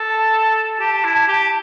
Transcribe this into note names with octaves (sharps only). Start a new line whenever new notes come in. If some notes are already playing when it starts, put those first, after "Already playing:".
Already playing: A4
A5
G4
E4
G4